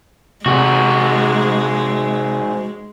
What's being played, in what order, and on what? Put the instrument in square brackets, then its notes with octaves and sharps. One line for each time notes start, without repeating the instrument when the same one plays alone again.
[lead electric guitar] G#2 F#4 [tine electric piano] C3 [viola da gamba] G#3